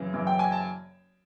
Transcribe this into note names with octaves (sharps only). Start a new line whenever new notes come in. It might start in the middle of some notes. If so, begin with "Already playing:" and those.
Already playing: F#2 C#3 E3
F#2 C#3 E3
G5
G#5
A5